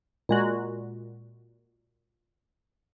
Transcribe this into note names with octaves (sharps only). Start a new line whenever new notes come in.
A#2 G#3 F#4